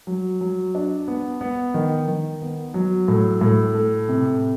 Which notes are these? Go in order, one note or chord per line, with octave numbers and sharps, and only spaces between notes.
F#3
F#3
D4
B3
B3
D#3
D#3
B3
F#3
A2
A2
A3
C3